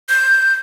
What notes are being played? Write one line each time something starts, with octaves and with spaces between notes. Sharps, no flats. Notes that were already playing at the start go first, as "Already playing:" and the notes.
G6